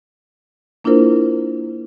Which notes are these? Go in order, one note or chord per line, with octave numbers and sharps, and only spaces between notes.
A#3 D4 E4 F4 A#4 C5